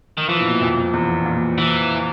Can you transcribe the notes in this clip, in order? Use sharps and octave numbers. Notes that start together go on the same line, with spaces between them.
D#3
E3 F3
A#2
B2
F2
F2
E2
A#2
E3